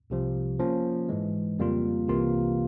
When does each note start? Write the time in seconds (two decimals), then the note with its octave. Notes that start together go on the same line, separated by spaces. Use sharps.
0.10 C2 C3 F3
0.59 F3 A#3 C#4
1.09 G#2 E3 G#3
1.59 F2 C#3 G3 A#3 F4
2.08 C2 C3 E3 A#3 F4